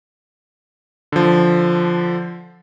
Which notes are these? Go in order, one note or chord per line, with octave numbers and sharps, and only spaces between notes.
D3 F3